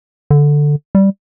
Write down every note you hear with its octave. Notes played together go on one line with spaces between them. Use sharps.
D3
G3